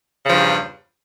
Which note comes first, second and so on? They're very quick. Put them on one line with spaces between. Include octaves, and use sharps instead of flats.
C#3 F3 G2 E2